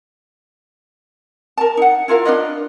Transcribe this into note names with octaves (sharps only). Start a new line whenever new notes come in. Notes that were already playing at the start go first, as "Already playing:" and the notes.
A#4 A5
D#4 F#5
E4 F4 A#4 F5
D4 F4 B4 D#5